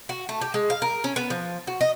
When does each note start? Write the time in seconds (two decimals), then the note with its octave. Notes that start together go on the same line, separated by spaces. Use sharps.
0.09 F#4
0.29 A3
0.41 G4
0.54 G#3
0.70 F5
0.82 A#4
1.04 C#4
1.16 B3
1.30 F3
1.67 F#4
1.81 D#5